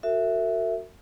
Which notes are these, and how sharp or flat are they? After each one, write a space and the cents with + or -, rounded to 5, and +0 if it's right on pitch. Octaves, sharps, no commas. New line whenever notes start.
F#4 +0 A#4 -45 E5 +0